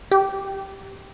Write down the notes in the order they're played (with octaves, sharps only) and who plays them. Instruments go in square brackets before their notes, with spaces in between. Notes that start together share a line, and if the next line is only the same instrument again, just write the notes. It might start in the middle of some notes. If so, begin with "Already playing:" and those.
[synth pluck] G4